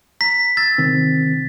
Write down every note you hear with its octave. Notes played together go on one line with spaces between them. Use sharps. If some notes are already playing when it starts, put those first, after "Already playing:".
A#5 B6
E6 A6
C3 D#3 C4